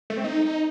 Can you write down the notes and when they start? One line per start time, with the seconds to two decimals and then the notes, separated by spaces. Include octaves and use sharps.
0.10 A3
0.17 C4
0.24 D#4